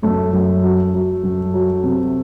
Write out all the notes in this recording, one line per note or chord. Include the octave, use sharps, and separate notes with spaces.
F#2 A3
F#2
F#3
F#3
F#2
F#3
C3